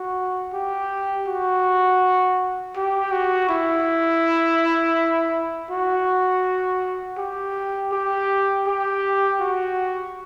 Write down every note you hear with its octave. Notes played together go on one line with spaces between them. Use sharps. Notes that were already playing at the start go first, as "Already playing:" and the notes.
Already playing: F#4
G4
F#4
G4
F#4
E4
F#4
G4
G4
G4
F#4